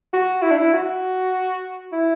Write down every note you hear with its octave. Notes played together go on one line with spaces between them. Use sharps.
F#4
E4
D4
E4
F#4
E4